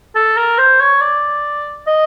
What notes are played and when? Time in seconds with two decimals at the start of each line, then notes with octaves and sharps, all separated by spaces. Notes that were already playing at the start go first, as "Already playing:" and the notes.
0.16 A4
0.37 A#4
0.58 C5
0.80 C#5
1.01 D5
1.87 D#5